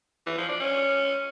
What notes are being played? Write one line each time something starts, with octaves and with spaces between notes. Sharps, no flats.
E3
F3
D4
C#4